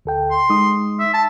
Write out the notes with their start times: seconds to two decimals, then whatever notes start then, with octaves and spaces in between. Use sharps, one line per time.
0.05 D2 A4 G5
0.31 C6
0.50 G#3 D#4 D#6
0.99 E5
1.13 A5